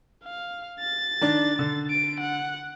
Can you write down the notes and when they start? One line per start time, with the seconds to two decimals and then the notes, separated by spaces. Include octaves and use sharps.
0.24 F5
0.80 A6
1.21 D#3 D4
1.59 D3
1.90 D7
2.20 F#5